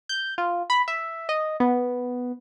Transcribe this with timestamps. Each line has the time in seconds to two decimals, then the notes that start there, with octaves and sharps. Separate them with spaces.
0.09 G6
0.38 F4
0.70 B5
0.88 E5
1.29 D#5
1.60 B3